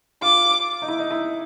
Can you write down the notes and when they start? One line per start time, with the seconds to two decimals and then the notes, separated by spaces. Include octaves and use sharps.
0.22 F4 D6
0.82 D#4
0.88 E4
0.99 D#4
1.11 E4